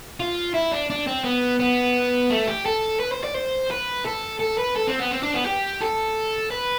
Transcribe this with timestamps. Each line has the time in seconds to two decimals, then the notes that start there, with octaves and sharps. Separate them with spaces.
0.20 F4
0.54 E4
0.71 D4
0.90 D4
1.07 C4
1.24 B3
1.59 B3
2.30 A3
2.47 G4
2.66 A4
3.00 B4
3.12 C5
3.23 D5
3.35 C5
3.71 B4
4.06 A4
4.40 A4
4.58 B4
4.76 A4
4.88 C4
4.99 B3
5.11 C4
5.23 D4
5.34 B3
5.45 G4
5.81 A4
6.51 B4